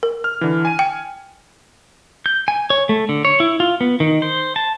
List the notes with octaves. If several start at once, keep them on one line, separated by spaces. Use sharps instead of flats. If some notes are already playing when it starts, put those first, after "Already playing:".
A#4
F6
D3 E3
G#5 D#7
G5
G6
G#5
C#5
A3
D3
C#5
E4
F4
B3
D#3
C5
A5